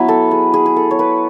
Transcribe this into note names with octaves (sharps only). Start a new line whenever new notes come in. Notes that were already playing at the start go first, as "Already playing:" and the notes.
Already playing: F#3 B3 E4 B4
A4
G#4
G#4
G#4
A4
C#5
B4